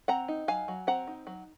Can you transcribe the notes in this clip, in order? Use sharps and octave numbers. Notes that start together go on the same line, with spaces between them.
C4 F#5 A#5
D#4
F#3 F5 G#5
F#3
C4 F#5 A#5
D#4
F#3